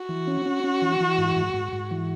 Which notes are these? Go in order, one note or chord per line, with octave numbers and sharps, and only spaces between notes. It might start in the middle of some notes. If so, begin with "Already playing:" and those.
Already playing: F#4
E3
C#4
C#4
C#4
E3
E3
G#2
G#2
G#2
G#2
E3